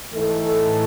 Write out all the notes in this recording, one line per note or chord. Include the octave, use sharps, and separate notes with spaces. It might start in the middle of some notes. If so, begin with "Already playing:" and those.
G#2 E3 A3 D#4 A4
A2